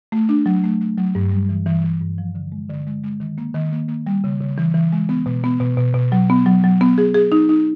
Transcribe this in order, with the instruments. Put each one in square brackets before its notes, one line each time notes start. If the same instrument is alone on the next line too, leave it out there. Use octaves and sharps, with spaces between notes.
[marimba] A3
D4
F#3
A3
A3
F#3
G2
G3
E3
E3
E3
G2
F3
D3
G#3
D3
G#3
G#3
D#3
A#3
D#3
A#3
A#3
G3
C#3
C#3
E3
E3
G#3
B3
B2
B3
B2
B2
B2
F#3
B3
F#3
F#3
B3
G#4
G#4
D#4
D#4